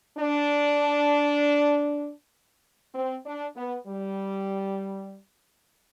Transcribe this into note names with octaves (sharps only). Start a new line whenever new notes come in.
D4
C4
D4
B3
G3